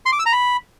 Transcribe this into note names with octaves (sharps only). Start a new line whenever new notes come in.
C6
D6
E6
A#5
B5